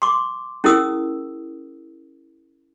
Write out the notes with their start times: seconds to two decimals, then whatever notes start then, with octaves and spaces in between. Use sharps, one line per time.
0.02 C6 D6
0.64 C#4 E4 G#4 A#4 D#6 E6